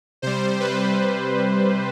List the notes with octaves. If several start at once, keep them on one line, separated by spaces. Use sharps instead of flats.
C3 G3 C5
B4